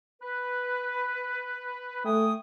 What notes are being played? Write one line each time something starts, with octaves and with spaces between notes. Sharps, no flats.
B4
A3 G5 G#5 D#6